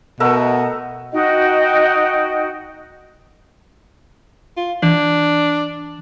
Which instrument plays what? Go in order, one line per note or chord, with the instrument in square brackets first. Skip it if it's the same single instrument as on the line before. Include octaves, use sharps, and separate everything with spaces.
[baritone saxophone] B2 [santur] A3 A#4 E5 [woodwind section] D#5 F#5
[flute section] D#4 F#4 D#5 G5
[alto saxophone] F4
[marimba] E3 [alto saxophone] D4